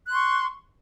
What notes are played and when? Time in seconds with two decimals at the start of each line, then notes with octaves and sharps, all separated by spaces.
0.06 F#6
0.10 C6
0.14 C#6